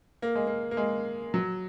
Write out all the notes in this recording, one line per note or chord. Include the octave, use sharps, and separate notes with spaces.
A#3
G#3
A#3
A#3
G#3
F#3